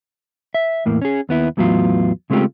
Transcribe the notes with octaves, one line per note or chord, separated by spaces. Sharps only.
E5
E2 A2 A#3
C#4 G#4
D#2 B3 E4
E2 A2 F#3 B3 F4
C#3 G#3 A3 C4 F4 G4